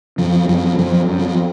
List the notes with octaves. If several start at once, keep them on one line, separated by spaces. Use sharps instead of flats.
F#2 F3
F#2 F3
F#2 F3
F#2
F3